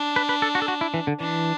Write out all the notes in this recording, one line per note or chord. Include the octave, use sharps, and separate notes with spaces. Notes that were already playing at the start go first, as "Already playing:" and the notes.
Already playing: D4
B4
B4
A4
F#4
A4
F#4
E4
E3
D3
E3 D4